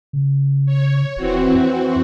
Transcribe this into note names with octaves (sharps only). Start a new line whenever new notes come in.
C#3
C#5
D#1 E3 C4 F#4
F2